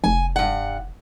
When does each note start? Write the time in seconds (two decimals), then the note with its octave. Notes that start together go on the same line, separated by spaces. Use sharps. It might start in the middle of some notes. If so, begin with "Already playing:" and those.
0.04 F1 G#5
0.36 G2 F#5